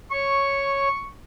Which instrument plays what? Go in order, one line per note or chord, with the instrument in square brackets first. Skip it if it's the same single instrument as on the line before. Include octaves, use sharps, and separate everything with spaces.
[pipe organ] C#5 [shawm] C#6